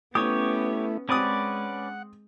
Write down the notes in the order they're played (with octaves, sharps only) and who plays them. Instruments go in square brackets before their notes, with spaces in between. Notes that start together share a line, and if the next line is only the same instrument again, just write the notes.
[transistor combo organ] A3 E4 [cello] B3 C#4 [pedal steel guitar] G4 C#5 [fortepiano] D#6
[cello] G#3 [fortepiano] C4 D#6 [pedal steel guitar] C#4 B4 D5 [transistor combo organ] F#5